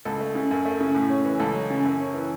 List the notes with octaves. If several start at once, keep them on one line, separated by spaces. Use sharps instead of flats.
C#2 A4
A3
C#3
F#2
A3
C#3
A2
C#4
E3
C#2 A4
F#3
C#3
F#2
C#4
E3